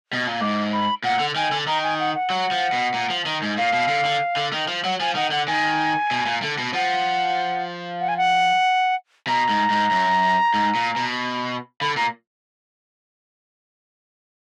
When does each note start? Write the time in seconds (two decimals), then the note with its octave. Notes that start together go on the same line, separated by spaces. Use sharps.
0.13 B2
0.27 A#2
0.41 G#2 D6
0.72 B5
1.04 A#2 F#5
1.19 D3
1.36 D#3 G#5
1.52 D3
1.67 D#3 A#5
1.83 G#5
1.99 F#5
2.15 F#5
2.30 F#3
2.51 F3
2.73 B2
2.94 A#2
3.10 F3
3.26 D#3
3.42 G#2
3.57 A#2 F5
3.73 B2
3.88 D3
4.05 D3
4.37 D3
4.53 D#3
4.68 F3
4.84 F#3 F#5
5.00 F3 G#5
5.15 D#3 F#5
5.31 D3 F#5
5.47 D#3 G#5
6.11 B2
6.26 A#2
6.42 D3
6.58 B2
6.74 F3 F#5
8.00 F#5
8.08 G#5
8.17 F#5
9.27 B2 A#5
9.49 G#2
9.70 G#2
9.91 F#2
10.54 G#2
10.75 A#2
10.96 B2
11.81 D3 B5
11.96 A#2 A#5